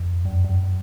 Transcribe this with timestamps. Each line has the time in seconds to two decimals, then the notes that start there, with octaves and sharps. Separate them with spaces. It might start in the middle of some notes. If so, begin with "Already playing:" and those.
Already playing: F2
0.25 F#2
0.45 F#2